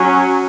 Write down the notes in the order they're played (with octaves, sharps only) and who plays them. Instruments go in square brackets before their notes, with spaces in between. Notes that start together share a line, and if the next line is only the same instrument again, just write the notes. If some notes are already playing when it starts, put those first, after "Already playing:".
Already playing: [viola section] F#3 C#4